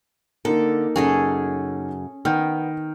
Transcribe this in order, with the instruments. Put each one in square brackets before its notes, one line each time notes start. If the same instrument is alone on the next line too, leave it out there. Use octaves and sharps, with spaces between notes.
[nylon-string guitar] D3 [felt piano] A#3 D#4 A#4 [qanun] A4
[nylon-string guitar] F#2 C#3 [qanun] C#4 G#4 A4
[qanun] D#3 [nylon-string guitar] B3 [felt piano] F6 G6